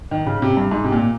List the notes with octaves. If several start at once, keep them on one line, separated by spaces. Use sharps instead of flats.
D#3
C#3
C3
G2
G#2
C3
A#2